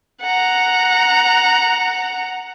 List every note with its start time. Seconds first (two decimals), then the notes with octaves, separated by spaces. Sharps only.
0.22 F#5 A#5